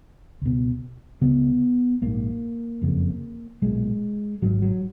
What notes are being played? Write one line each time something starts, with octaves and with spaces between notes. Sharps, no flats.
C#2 B2
C#2 C#3 B3
A#1 G#2 A#3
F#1 F2 C#3
B1 A#2 G#3
G#1 G#2 F#3
F#3